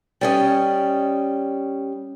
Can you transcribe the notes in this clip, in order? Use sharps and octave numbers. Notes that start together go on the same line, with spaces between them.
G3 C#4 D#5